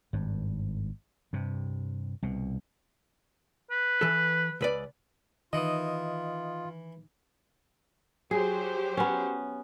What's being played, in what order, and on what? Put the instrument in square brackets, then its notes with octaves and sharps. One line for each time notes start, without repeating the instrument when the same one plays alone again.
[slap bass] G#1 G2
G2 C3
C2 B2
[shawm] B4
[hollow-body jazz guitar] E3 A4
C#2 B4 D5
[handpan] D#3 [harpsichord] E3 [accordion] F4 [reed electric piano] D#5 D#6
[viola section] F#3 G4 C5 [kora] G#4
[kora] B3 C#4